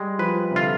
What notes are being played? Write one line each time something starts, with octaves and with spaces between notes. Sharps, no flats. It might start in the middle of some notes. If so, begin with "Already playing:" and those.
Already playing: G3 G#3
F3 B4
C3
D3 F4